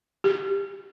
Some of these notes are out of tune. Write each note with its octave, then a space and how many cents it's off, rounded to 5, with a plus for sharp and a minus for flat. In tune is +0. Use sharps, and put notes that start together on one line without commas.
G4 +15